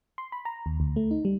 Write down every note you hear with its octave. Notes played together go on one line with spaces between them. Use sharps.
C6
B5
A#5
D#2
D2
A3
D#4
G3